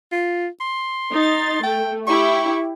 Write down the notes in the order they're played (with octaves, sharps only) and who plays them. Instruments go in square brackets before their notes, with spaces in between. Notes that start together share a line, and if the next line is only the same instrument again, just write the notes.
[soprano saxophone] F4
C6
[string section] D#4 A6
[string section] A3 [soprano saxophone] G5
[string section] E4 G4 [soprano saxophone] C#6